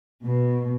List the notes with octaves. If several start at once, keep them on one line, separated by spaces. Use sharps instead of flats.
B2